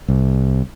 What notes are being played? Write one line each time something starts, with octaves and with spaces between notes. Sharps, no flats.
C2